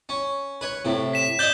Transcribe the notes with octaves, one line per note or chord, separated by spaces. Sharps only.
C#4
B4 C#5
A2 C3
B6 E7
D5 D#5 G6 G7